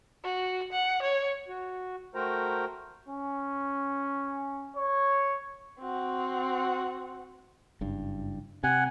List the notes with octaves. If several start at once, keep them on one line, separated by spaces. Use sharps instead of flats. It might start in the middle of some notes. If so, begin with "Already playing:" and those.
F#4
F#5
C#5
F#4
A3 F#4 A#4 C5 G5 A#5
C#4
C#5
C4 F#4
F#1 G2
C3 F#5 G#5